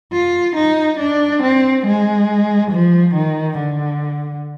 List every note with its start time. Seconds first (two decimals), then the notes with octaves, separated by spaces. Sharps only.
0.13 F4
0.56 D#4
0.99 D4
1.42 C4
1.85 G#3
2.71 F3
3.14 D#3
3.58 D3